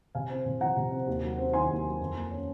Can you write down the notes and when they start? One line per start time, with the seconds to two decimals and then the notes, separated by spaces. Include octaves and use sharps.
0.15 C3 F5 G#5
0.30 C4
0.46 C3
0.60 F3 F#5 A#5
0.77 C3
0.91 C4
1.07 D#2
1.22 F#3
1.38 C4
1.53 D#3 G#5 C6
1.70 D#2
1.84 F#3
2.00 F2
2.15 A#3
2.31 C#4